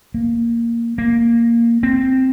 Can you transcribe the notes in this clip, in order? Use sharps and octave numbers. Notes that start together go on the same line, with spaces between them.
A#3
A#3
C4